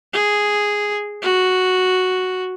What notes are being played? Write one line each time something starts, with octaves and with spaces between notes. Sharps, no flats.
G#4
F#4